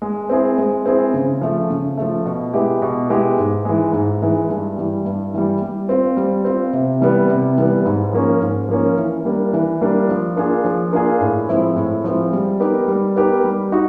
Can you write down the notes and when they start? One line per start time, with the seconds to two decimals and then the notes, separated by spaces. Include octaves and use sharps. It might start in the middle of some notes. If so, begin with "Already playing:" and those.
0.02 G#3
0.29 C4 E4 G#4
0.58 G#3
0.86 C4 E4 G#4
1.14 C#3
1.41 F3 A3
1.70 C#3
1.97 F3 A3
2.25 B2
2.54 G#3 B3 E4 G4
2.82 B2
3.10 G#3 B3 E4 G4
3.38 G#2
3.65 E3 G#3
3.93 G#2
4.22 E3 G#3
4.49 G2
4.78 E3 G3
5.05 G2
5.34 E3 G3
5.61 G3
5.89 C4 F4
6.17 G3
6.45 C4 F4
6.73 C3
7.01 E3 G3 B3
7.29 C3
7.58 E3 G3 B3
7.86 G#2
8.13 F3 A#3 C#4
8.41 G#2
8.69 F3 A#3 C#4
8.97 E3
9.25 G3 A#3 D4
9.53 E3
9.81 G3 A#3 D4
10.09 F3
10.36 A#3 D4 F4 G#4
10.64 F3
10.93 A#3 D4 F4 G#4
11.21 A2
11.49 F3 G#3 C4 E4
11.76 A2
12.04 F3 G#3 C4 E4
12.33 G3
12.60 B3 D#4 G4 A#4
12.88 G3
13.16 B3 D#4 G4 A#4
13.44 G3
13.72 D#4 F#4